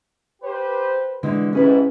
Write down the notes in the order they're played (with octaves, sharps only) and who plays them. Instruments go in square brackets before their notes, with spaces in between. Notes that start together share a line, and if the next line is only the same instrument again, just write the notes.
[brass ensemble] G4 B4 C5
[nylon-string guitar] D3 E3 G#3
[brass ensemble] G#2 C3 E4 [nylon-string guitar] C#4 G#4 B4